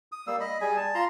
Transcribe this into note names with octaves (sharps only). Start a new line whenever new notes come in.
D#6
G3 A#3 E6
D#5 B5
G3 G#4 G#5
A5
F4 A#5 C6